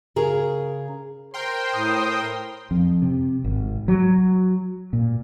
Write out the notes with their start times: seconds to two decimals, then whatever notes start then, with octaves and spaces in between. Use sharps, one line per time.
0.16 C#3 G#4 A#4
1.34 A#4 C5 G5 C6
1.74 A2 D#6
2.71 F2
3.02 C3
3.44 G#1
3.88 F#3
4.93 A#2